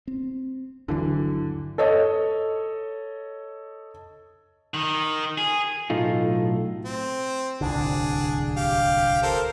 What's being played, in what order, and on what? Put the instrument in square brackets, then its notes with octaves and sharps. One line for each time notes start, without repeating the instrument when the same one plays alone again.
[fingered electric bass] C4
[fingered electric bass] G1 D#2 F#3 [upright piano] D3 E3
[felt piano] A4 C#5 D#5
[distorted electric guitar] D#3
G#4
[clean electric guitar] B1 A2 A3 D#4 F4
[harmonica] C4
[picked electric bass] D1 C2 D3 [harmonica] D4 G#4
[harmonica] G4 F5
A4 A#4 C5